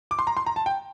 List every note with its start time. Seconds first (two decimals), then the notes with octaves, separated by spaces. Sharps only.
0.11 D6
0.19 C6
0.27 A#5
0.37 C6
0.46 A#5
0.56 A5
0.66 G5